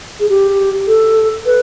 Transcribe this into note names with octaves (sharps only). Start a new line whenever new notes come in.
G#4
G4
A4
B4